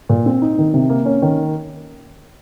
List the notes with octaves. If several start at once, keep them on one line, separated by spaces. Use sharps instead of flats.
A#2
C4
D#4
D#3
C3
A#3
C#4
D#3